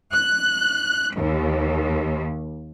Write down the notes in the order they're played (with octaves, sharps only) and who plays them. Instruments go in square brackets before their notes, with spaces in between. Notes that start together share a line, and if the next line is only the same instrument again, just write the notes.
[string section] F#6
D#2